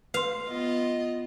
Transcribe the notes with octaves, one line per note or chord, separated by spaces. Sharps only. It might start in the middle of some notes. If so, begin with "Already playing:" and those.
B4 F5 C6
B3 F4 D#5